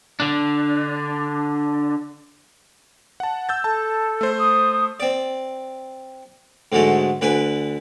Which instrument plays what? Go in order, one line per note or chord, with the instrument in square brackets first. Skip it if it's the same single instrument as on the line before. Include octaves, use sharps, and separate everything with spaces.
[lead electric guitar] D3 D4
[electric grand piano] F#5 A5
E6 G6 A6
[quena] A4 [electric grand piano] A5
[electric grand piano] A3 C5
[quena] D#6
[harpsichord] C4 D5
G#2 D3 F#3 G#3 A3
D2 D4 B4 G#5 B5